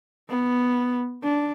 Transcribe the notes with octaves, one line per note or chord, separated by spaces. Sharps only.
B3
D4